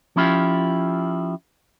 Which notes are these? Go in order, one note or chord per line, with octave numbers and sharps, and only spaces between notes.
F3 C#4 E4 F4 G4